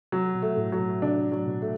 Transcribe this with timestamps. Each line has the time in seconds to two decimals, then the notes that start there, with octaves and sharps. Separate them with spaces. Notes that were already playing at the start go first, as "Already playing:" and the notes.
0.12 C3 F#3
0.34 B2
0.42 A3
0.57 A2
0.72 F#3
0.80 B2
1.02 C3 D4
1.25 A2
1.32 F#3
1.37 A2
1.47 B2
1.62 A3